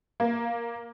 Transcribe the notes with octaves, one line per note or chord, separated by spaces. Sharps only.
A#3